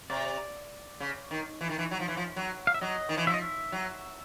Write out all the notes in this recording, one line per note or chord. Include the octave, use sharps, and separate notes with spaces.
C3 D5
C#3
D#3
E3
D#3
E3
F#3
F3
E3
F3
F#3
F5
E5
F#3 D#5
D#3
E3
F3 E5
D#5
E5
F#3